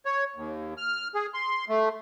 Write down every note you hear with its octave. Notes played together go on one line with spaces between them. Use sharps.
C#5
D#2
F6
G#4
C6
A3